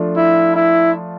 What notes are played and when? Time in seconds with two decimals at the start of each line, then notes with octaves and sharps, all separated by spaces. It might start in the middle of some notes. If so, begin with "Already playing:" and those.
Already playing: F3 A3 D4 F4
0.16 E4
0.56 E4